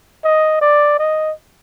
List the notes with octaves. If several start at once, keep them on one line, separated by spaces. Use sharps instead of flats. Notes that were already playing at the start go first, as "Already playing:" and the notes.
D#5
D5
D#5